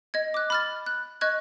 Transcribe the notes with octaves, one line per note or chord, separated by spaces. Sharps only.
D#5 G#6
D6 F#6
B5 F6 A6
F#6
D#5 C#6 F#6 G#6